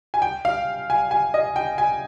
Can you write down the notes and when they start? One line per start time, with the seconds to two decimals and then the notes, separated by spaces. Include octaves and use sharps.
0.14 G#5
0.22 G5
0.45 F5
0.90 G#5
1.11 G#5
1.34 D#5
1.56 G5
1.78 G#5